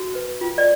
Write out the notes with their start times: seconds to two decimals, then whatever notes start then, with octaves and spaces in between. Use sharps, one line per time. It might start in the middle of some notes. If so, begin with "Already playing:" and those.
Already playing: F#4
0.15 B4
0.41 F4
0.58 D5